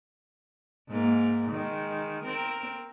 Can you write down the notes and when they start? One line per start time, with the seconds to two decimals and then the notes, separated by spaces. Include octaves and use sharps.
0.89 G#2 A#3
1.50 D#3 G#3
2.23 C4 A#4